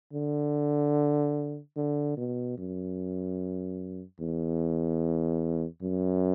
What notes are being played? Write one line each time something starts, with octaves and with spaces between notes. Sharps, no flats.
D3
D3
B2
F#2
E2
F#2